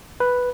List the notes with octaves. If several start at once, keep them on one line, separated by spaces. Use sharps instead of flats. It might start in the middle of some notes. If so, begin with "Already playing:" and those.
B4